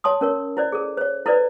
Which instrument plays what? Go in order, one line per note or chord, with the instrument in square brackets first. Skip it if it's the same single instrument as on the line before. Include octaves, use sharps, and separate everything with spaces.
[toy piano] C#5 A5 C6 D#6
C#4 A#4 C#5
E4 C5 D5
G#4 A4
C5 C#5
E4 A4 B4 C5 D5